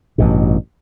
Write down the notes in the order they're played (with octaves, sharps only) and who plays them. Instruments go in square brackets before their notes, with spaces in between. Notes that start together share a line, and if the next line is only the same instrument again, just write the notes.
[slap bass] A1 G2 B2